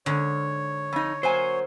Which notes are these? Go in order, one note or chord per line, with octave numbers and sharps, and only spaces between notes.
G#2 D3 C#5
F2 D#4
F#3 A#3 C5 G#5